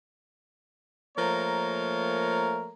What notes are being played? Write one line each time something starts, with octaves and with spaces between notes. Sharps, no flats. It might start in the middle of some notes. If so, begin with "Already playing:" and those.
F3 A3 A#3 A#4 C#5 A#5